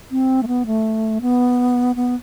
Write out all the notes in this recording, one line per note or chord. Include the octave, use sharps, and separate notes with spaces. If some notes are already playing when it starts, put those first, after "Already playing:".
C4
A3
B3
A3
B3
B3